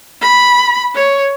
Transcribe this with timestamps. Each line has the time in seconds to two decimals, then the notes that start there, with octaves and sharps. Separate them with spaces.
0.21 B5
0.95 C#5